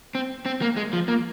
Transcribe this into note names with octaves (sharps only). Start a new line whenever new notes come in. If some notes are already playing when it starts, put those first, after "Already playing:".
C4
C4
A#3
G#3
F3
A#3